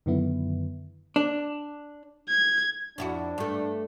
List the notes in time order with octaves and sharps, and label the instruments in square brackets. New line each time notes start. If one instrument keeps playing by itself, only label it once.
[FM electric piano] F#2 D3 D#3 B3 E4
[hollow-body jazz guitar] D4
[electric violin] G#6
[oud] F2 E4 F#4 [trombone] D4
[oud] G2 A3